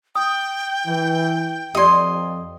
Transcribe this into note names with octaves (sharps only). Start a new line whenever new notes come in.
G5 D#6
E3
F2 G4 D5 D#5 C6